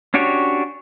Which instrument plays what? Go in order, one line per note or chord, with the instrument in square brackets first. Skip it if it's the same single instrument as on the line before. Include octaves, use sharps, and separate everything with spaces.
[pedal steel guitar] C#4 D4 F#4 G4 C#5